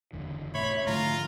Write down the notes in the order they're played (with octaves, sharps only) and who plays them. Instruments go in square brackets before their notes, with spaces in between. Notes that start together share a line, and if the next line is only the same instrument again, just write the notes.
[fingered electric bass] F#1 E2 D3
[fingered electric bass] A2 C3 [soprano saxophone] C#5 [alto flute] E5 [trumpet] B5
[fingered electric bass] G#2 D3 F3 [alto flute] A3 [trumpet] F4 [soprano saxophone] A#5